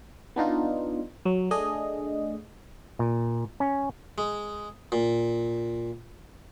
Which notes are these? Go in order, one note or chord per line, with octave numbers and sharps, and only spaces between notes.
B3 D4 D#4 F4
F#3
A3 D4 G#4 D#5
A#2
C#4
G#3
A#2